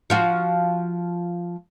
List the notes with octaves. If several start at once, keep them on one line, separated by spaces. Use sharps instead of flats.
F3 F4 F#4